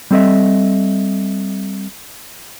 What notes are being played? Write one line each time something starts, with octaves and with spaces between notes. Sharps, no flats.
G3 C4 A4 D#5 E5